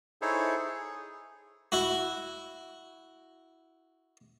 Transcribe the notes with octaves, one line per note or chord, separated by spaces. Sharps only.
D#4 E4 G#4 A4 C5 C#5
G#4
E4 F#4